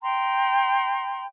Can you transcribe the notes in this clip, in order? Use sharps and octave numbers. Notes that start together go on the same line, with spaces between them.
G5 A#5 C6